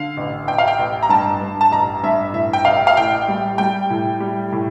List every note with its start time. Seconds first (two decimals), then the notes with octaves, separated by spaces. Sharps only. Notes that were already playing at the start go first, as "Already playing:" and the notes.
Already playing: D3 F5
0.17 A1
0.47 A1 G5
0.58 F5
0.68 G5
0.79 A1
1.02 A#5
1.09 G2 A5
1.41 G2
1.61 A5
1.71 A1 A#5
2.03 G2 E5
2.34 A2 E5
2.53 G5
2.65 A1 F5
2.87 F5
2.96 A2 G5
3.28 G3
3.58 G3 G5
3.90 A2
4.20 G3
4.52 A2